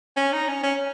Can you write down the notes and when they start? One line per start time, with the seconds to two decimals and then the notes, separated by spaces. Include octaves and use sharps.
0.17 C#4
0.33 D#4
0.48 C#4
0.63 C#4